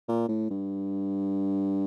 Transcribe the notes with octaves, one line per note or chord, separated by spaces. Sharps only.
A#2
A2
G2